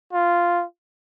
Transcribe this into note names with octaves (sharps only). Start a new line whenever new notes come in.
F4